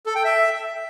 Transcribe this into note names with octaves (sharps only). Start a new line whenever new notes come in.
A4
G5
E5